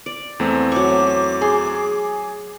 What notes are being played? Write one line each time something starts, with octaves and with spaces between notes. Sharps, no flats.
D5
E2 A3 C4
F#3 C#6 D6
G#4 C6